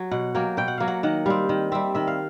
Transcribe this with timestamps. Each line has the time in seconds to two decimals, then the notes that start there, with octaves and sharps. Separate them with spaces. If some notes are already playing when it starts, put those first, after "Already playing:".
Already playing: F#3
0.11 B2 F#5
0.35 F#3 A#3 G5
0.57 B2 G5
0.68 F#5
0.78 F#3 A#3 F5
0.88 F#5
1.03 D#3 F#5
1.26 G3 C4 F5
1.49 D#3
1.72 G3 C4 E5
1.95 D#3 E5
2.08 F5